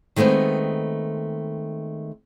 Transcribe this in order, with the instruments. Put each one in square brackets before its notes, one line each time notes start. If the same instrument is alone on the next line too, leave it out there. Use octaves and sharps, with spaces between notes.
[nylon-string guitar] D#3 G#3 A3 B3 C4